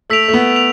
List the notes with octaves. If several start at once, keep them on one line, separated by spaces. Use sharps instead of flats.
A3 E6 B6 D7 F7
A3
B3
F7